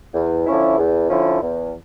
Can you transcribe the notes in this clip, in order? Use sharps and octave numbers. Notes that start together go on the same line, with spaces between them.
E2
D3 F3 C#4 E4
E2
D3 F3 C#4 E4
E2